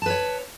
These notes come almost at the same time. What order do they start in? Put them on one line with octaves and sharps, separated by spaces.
A5 B4 C#5